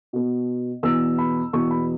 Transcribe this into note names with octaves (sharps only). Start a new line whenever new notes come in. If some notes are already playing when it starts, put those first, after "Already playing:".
B2 B3
E2 B2 B3 E6
B5
E2 B2 B3 C#6
B5